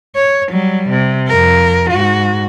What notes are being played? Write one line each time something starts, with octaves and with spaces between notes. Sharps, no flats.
C#5
F#3 G3
C3
F2 A#4
G#2 F#4